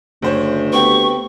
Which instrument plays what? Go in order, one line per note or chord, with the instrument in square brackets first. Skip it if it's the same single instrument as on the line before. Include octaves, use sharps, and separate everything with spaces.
[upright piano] F#1 C5 C#5 [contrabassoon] D2
[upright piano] B3 C4 G4 [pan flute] C#6